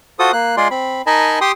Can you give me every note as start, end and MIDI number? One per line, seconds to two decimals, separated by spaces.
0.19 0.32 65
0.19 0.32 66
0.19 0.32 69
0.19 0.32 72
0.19 0.32 87
0.33 0.56 58
0.33 0.56 90
0.57 0.68 56
0.57 0.68 65
0.57 0.68 68
0.57 0.68 74
0.57 0.68 84
0.71 1.02 60
0.71 1.02 83
1.07 1.39 63
1.07 1.39 70
1.07 1.39 75
1.07 1.39 80
1.07 1.39 81
1.07 1.39 83
1.41 1.52 67
1.41 1.52 79
1.41 1.52 84
1.41 1.52 87